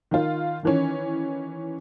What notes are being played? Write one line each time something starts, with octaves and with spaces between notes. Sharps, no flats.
D#3 F4
D#3 E3 C#4